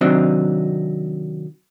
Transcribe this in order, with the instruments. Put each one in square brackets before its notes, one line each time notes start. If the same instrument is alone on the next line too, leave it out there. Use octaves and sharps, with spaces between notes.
[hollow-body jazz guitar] C3 D#3 F#3 C4 D4 D#4